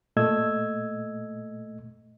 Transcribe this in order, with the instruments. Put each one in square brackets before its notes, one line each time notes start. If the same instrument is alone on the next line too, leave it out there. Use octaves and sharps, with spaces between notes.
[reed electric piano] A#2 A3 D#5 E6 G#6